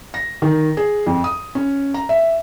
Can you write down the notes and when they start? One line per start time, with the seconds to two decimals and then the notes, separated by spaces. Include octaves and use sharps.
0.14 A#6
0.42 D#3
0.77 G#4
1.07 F2
1.24 D#6
1.55 C#4
1.94 A#5
2.09 E5